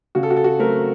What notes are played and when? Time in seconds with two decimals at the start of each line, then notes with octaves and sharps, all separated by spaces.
0.15 C#3 F#4
0.23 A4
0.30 F#4
0.36 A4
0.44 F#4
0.59 F#3 A3 C4 A#4